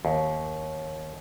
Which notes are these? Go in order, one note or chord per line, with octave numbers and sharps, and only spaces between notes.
D#2